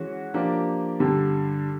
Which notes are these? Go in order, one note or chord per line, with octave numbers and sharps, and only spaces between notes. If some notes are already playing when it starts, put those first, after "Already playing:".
Already playing: E3 G#3 C#4 F#4
F3 A#3 D4 G4
G2 D3 G3